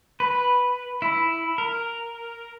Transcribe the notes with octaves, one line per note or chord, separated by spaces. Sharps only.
B4
E4
A#4